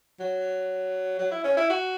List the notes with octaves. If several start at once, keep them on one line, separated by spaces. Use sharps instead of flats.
F#3
F#3
E4
C#4
E4
F#4